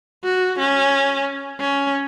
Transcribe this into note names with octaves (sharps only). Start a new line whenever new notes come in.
F#4
C#4
C#4